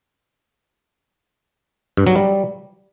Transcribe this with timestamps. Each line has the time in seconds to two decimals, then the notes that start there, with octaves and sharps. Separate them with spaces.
1.97 G2
2.07 F#3
2.16 G3